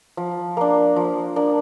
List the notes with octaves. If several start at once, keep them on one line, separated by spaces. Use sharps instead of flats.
F3
A#3 D4
F3
A#3 D4